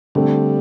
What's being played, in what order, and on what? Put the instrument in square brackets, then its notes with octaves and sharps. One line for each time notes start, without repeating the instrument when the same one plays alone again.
[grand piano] D3 A3 C4 [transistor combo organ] G3